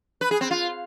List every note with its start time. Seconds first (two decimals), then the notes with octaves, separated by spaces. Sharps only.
0.21 B4
0.31 G#4
0.41 C4
0.51 F4